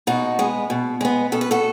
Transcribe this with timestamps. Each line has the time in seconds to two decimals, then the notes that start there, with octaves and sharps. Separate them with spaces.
0.07 B2 D#4 F#4
0.39 G#3 B3
0.70 B2
1.01 G#3 B3
1.32 B2 A4
1.41 B4
1.51 F#4 A4